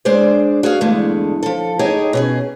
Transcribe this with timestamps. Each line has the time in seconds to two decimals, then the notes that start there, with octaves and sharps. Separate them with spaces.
0.05 G#3 D4 G#4 C5 D5
0.63 F#4 G#4 F5
0.81 E2 G2 D3 G#3 A3
1.43 F3 A4
1.79 D#4 G4 G#4 C#5 D#5
2.13 B2 C#4 G#4